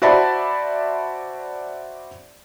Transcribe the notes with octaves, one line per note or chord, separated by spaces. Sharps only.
F#4 C5 D5 E5 A5 B5